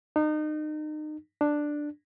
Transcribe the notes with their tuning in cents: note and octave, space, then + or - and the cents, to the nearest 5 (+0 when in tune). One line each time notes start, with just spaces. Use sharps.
D#4 -30
D4 +5